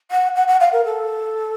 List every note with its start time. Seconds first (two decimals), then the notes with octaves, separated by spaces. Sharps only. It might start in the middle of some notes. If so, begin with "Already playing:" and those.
0.11 F#5
0.35 F#5
0.47 F#5
0.60 F5
0.72 A#4
0.84 A4